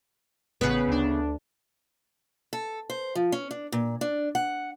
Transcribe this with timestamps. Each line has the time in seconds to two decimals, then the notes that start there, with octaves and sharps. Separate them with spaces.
0.61 A1 C#3 B3 B4
0.88 D2 D4
2.53 A4
2.90 C5
3.15 F3
3.32 C#4
3.51 D4
3.72 A#2
4.01 D4
4.35 F#5